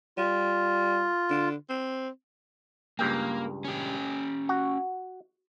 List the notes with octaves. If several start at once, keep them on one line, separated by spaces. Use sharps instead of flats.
G3 F4
D3
C4
C#2 G2 A#3 G5
C#4 G4
F#4